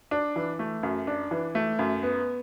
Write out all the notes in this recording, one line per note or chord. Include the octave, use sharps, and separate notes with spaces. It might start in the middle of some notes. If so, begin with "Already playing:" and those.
D4
E3
A3
F#2
D4
E3
A3
F#2
B3